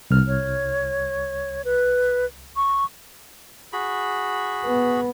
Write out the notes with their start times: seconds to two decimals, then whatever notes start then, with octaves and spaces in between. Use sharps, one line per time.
0.10 C2 F6
0.27 C#5
1.65 B4
2.56 C#6
3.73 F#4 G#4 B5
4.65 B3